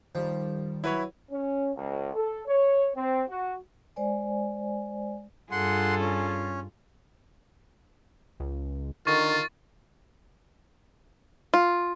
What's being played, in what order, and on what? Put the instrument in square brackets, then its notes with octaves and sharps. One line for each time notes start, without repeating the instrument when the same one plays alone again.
[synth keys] D#3 G3 [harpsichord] F3
[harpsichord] F#3 [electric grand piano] E4 B4 C#5
[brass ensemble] C#4
C#2
A4
C#5
C4
F#4
[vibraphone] G#3 C5 D5 G#5
[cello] G2 F4 [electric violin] G#4 A4 [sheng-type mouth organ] F#5 C6
[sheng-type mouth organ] C#4
[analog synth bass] C#2
[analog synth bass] D3 [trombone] D#3 [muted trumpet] F4 [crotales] C#6 A6
[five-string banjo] F4